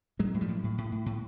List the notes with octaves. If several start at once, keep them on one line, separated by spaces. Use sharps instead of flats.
A2 F#3 G#3
A2
F3 G3
A2
A2
A2
A2
A2